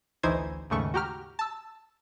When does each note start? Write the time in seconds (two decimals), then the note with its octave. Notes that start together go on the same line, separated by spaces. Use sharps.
0.23 A1 D2 E3 D#4 C5 G#6
0.70 D#2 G#2 C#3 A3 C#6
0.94 F#4 G4 A#5 F6
1.39 A5 E6